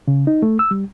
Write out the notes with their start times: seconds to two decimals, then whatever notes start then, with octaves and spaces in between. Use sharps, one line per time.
0.08 C#3
0.27 D#4
0.42 A3
0.59 E6
0.71 G3